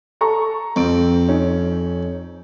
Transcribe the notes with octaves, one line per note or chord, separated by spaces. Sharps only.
A4 A#5 C#6
F2 F3 C4 D7
C#4 D#4